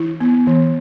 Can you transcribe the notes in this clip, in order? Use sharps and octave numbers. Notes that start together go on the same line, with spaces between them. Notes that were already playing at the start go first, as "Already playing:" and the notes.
Already playing: E3 E4
B3
E3